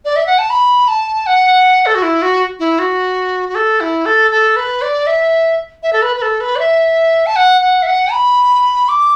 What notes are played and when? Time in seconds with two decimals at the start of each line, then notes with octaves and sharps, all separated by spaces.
0.05 D5
0.16 E5
0.27 F#5
0.39 A5
0.50 B5
0.88 A5
1.27 F#5
1.86 A4
1.95 F#4
2.03 E4
2.22 F#4
2.59 E4
2.79 F#4
3.49 F#4
3.55 A4
3.80 E4
4.06 A4
4.31 A4
4.56 B4
4.82 D5
5.07 E5
5.83 E5
5.93 A4
6.02 B4
6.17 B4
6.22 A4
6.41 B4
6.56 D5
6.59 E5
7.26 A5
7.36 F#5
7.61 F#5
7.83 E5
7.87 F#5
8.12 B5
8.89 D6